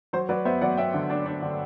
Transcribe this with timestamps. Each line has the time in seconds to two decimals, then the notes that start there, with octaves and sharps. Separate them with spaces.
0.13 F#3 C5
0.29 F#3 B4 D5
0.45 B3 C5 E5
0.61 F#3 D5 F#5
0.77 B3 E5 G5
0.94 D3
1.10 D4
1.26 D4
1.42 D3